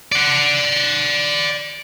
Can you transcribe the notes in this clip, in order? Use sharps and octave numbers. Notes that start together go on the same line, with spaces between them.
D5 F#5